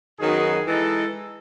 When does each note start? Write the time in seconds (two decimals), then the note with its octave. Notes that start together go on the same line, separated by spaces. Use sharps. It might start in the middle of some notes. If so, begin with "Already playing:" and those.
0.19 F#2 D#3 F#3 B3 D#4 G#4
0.66 E3 G#3 D#4 A4